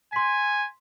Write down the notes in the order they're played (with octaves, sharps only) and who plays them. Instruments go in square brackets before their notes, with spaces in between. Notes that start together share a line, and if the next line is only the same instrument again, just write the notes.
[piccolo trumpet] G#5 [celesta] C6 B6